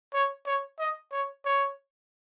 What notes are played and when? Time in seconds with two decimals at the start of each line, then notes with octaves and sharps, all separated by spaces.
0.14 C#5
0.46 C#5
0.79 D#5
1.12 C#5
1.45 C#5